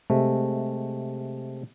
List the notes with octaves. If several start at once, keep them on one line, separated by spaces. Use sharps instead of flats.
C3 G#3 A3